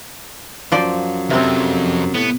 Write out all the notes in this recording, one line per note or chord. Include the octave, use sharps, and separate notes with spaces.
F#2 F3 C5 D5
F2 C3 C4
A2 B3